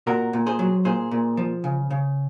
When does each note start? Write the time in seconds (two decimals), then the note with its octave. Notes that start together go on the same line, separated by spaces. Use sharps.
0.07 A#2 F#4 A#4
0.33 A#2
0.46 G#4 C5
0.59 F#3
0.85 A#2 G#4 C5
1.11 A#2
1.37 F3
1.64 C#3
1.90 C#3